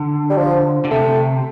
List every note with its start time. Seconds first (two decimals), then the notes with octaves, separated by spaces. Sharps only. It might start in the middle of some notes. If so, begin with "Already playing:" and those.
Already playing: D3
0.30 G3
0.37 F3
0.85 D3
0.91 C3 A3